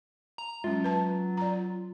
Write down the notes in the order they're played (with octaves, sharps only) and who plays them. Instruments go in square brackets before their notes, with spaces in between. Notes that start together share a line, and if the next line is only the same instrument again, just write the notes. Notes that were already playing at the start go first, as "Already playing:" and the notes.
[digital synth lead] A#5
[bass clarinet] F#3 [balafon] G#3 C#4 [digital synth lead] F4
[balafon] B4 A5
D5 A#5